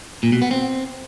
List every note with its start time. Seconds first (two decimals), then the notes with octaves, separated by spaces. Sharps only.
0.23 A#2
0.32 B2
0.42 B3
0.51 C4